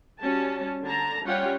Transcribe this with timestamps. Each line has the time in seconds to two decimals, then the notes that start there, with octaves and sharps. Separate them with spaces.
0.20 G3 C#4 F#4 A5
0.85 D3 A5 A#5
1.26 G3 C#4 F4 C#5 F#5 G5